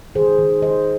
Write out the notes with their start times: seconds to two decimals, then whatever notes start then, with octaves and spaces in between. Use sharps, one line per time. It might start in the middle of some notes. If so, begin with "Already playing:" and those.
0.15 D#3 G#4 C5
0.38 D#3
0.62 D#3 C5 D#5